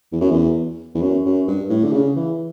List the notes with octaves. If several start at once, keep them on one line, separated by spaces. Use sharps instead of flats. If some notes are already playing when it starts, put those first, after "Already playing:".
E2
F#2
E2
E2
F#2
F#2
G2
A2
D3
C#3
E3